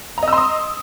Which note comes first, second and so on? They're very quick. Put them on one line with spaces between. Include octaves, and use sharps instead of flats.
A#5 D#5 E6 C6 D#6